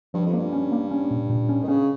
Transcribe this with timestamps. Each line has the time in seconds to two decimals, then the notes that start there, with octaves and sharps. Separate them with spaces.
0.14 G2 F3
0.26 F2
0.33 G2 A#3
0.53 C#4
0.72 A#3
0.91 C#4
1.11 A#2
1.30 A#2
1.49 C#4
1.63 D#3
1.68 C#3 C#4